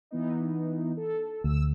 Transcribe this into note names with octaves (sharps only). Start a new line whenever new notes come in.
E3 B3 D#4
A4
D2 E6